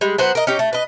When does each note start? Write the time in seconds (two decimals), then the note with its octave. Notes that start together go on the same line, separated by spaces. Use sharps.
0.01 G3 G#3
0.18 F#3 B3 C5 F#5
0.35 A#4 D#5
0.47 C#4 D#4 G4
0.59 A3
0.73 B4 D#5